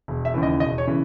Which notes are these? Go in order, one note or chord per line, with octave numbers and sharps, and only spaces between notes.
E1
E5
D#2 C#3 E3
D#5
E1 D#5
C#5
C#3 E3